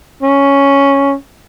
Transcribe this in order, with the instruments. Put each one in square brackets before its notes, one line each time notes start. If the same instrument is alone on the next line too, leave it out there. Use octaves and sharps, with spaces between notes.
[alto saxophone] C#4